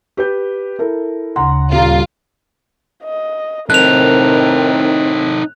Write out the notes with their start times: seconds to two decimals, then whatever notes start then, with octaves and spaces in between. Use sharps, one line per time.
0.17 G4 B4 G6
0.79 E4 A4 A#4
1.36 D2 C#3 F#5 A#5 C6
1.72 D#1 G3 F4 A#5
3.04 D#5
3.70 A2 D#3 C4 D#4 A4 A#4 F#6 F7